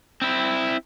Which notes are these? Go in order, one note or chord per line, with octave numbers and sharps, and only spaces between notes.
C4 E4